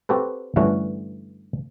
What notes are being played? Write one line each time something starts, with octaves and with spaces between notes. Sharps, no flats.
C4 F#4 G4 A4 B4
G2 D3 E3 A3 C#4 F#4